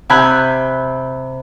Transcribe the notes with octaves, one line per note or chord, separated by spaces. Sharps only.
C3 G#5 B5 F#6 G6